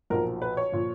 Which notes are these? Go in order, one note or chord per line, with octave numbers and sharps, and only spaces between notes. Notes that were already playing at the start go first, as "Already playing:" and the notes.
B1 A#2 F3 A#4
B4
C#5
A#2 F3